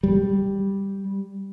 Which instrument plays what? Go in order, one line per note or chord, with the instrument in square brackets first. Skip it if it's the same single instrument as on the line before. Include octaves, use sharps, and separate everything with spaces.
[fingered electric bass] G3